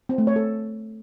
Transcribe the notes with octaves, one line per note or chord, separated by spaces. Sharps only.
C4
A3
C#5
A4